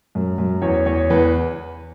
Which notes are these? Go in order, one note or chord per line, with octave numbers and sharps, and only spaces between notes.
F#2
F#2
E2 C#5
E2 C#5
E2 B4